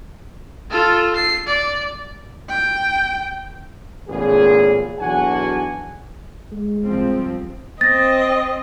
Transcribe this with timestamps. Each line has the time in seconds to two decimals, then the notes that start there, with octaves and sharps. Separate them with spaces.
0.70 F4 A4
1.16 C7
1.47 D5
2.49 G5
4.09 A1 A#2 C#3 B3 G#4
4.99 B1 E2 D4 F#4 F#5 G#5
6.52 G#3
6.84 C2 F3 C4
7.81 C4 D#5 A6 A#6